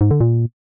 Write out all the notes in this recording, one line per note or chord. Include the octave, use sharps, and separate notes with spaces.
G#2
D3
A#2